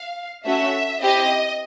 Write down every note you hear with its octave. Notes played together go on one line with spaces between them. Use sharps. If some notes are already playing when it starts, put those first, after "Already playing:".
Already playing: F5
A3 C#4 F#4 E5
C4 E4 G4 D#5